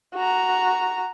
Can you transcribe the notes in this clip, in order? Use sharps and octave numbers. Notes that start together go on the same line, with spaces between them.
F#4 A#5